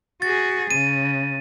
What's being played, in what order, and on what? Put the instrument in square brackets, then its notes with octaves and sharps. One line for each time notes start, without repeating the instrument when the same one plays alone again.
[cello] F#4 G#4 [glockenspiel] A6
[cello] C#3 [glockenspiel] D#7